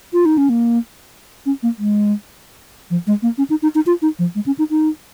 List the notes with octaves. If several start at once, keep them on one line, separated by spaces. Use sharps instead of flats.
F4
D#4
C#4
A#3
C#4
A#3
G#3
F3
G#3
A#3
C#4
D#4
D#4
D#4
F4
D#4
F3
G#3
C#4
D#4
D#4